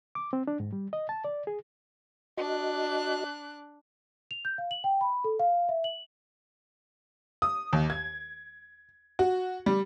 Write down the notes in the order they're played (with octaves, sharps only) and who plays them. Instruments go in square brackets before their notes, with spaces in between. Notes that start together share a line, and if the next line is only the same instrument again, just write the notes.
[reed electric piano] D6
C4
D4
G#2
G3
D#5
A5
D5
G#4
[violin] D4 F#6 [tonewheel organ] F#4 D#5
[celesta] F7
G6
F5
F#7
G5
B5
A4
F5
E5
F#7
[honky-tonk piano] D#6
D#2
G#6
F#4
G3